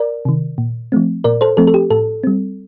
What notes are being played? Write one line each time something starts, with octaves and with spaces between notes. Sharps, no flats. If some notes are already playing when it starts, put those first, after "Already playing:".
Already playing: A#4 D5
C3 D#3
A#2
F3 A3 C4
A#2 A#4 D5
A4 C5
F3 A3 C4 A4
A4
G4
A2 A4
G3 C4